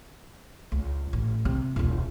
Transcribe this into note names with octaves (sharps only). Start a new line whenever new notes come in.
C#2
A1
C3
E1 C#2